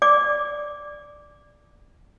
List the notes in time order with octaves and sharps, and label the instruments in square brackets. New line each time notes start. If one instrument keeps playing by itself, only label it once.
[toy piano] D5 D6